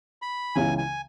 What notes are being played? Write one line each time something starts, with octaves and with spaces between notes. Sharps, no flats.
B5
C#2 C#3 E3 G#5
G#5